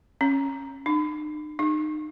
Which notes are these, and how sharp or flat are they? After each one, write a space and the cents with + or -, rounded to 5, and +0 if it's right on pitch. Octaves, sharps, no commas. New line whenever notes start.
C#4 -20
D#4 -45
D#4 -25